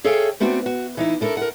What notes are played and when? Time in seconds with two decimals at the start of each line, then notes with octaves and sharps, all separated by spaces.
0.04 G#4 A4 C#5 E5 F5 G5
0.40 A3 B3 C4 D4 F#4
0.66 F#4
0.97 E3 D#4 E4
1.21 D4 E4 A4 A#4
1.37 A#4 F#5